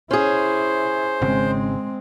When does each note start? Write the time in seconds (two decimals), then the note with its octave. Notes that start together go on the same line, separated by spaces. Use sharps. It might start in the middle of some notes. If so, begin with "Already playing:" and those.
0.11 C#4 E4 G#4 C5
1.22 G#1 C#3 G#3 C4